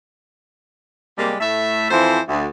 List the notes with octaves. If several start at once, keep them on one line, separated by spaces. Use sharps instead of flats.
C3 G3 G#3 A#3
A2 A3 E5
F2 E3 F3 C5
D2